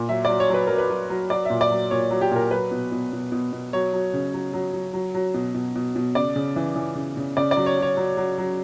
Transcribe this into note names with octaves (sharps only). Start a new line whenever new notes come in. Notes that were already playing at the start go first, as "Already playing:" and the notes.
Already playing: A#2
F#3 E5
F#3 D5
C#5
F#3 B4
F#3 A#4
B4
F#3
F#3
F#3 D5
A#2 E5
D5
F#3
A#2 C#5
F#3
G4
A#2 A#4
F#3 B4
B2
B2
B2
B2
B2
F#3 C#5
F#3
C#3
F#3
F#3
F#3
F#3
F#3
B2
B2
B2
B2
C#3 D5
C#3
E3
E3
C#3
C#3
C#3 D5
D5
F#3
C#5
F#3 C#5
F#3
F#3
F#3